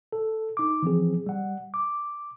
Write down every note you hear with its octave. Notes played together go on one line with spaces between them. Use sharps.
A4
D#4 D6
E3 F3 C4 G#4
G3 F#5
D6